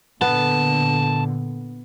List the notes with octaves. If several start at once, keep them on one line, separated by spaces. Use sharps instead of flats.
A#2 D3 B3 A5